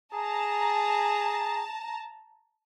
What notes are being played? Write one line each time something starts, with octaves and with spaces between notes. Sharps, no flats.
G#4 A5 A#5